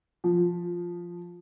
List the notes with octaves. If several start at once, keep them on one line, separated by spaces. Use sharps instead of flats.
F3